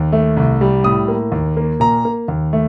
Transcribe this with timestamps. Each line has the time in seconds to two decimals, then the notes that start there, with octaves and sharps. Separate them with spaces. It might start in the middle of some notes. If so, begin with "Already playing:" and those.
Already playing: D#2
0.12 A3
0.37 C2
0.61 G3
0.84 A2 D#6
1.08 A#3
1.32 D#2
1.57 A#3
1.80 A#2 A#5
2.05 A#3
2.28 D#2
2.53 A3